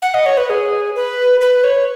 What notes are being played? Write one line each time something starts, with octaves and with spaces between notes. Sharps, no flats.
F#5
D#5
C#5
B4
G#4
B4
B4
C#5